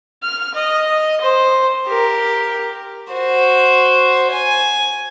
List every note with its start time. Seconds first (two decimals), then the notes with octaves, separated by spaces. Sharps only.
0.23 F6
0.55 D#5
1.21 C5
1.88 G4 A#4
3.13 F#4 C5
4.32 G#5